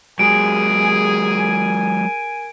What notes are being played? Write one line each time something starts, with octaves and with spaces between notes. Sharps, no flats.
F#3 G#3 G#4 A#4 G#5 D7